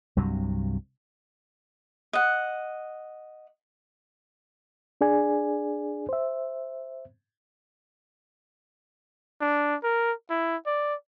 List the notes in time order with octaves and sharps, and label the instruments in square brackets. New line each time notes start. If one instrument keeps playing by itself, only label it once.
[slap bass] C2 G2 C3 F#3
[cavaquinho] D#5 F#5
[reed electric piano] D4 G#4 D5 G#5
C5 E5
[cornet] D4
A#4
E4
D5